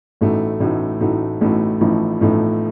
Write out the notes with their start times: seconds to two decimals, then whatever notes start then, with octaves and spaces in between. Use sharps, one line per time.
0.21 A1 A2 A3 D#4 F#4
0.60 A1 A2 A3 D#4 F#4
1.00 A1 A2 A3 D#4 F#4
1.41 A1 A2 A3 D#4 F#4
1.81 A1 A2 F3 A3 D#4
2.21 A1 A2 F3 A3 D#4